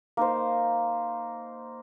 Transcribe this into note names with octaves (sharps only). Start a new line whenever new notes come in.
A#3 D#4 C5